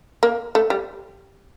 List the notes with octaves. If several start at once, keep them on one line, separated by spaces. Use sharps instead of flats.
A#3
A3
G3